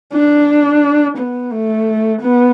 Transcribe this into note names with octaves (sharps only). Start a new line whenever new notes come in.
D4
B3
A3
B3